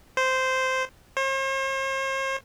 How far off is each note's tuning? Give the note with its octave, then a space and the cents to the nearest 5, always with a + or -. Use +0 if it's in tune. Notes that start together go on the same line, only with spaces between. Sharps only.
C5 -10
C5 +45